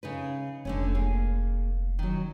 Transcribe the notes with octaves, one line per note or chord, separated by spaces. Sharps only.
C#3 D#4 B4
F1 D3 A3 C#4
A#3 G#4
D#3 F#3 C#4